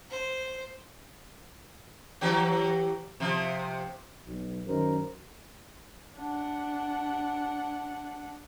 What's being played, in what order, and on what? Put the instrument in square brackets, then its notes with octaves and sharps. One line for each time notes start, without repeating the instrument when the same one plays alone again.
[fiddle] C5
[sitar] E3 F#3 G4
C3 F3
[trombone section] B1
F#2 D#3 A#4 C5
[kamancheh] D4 F#5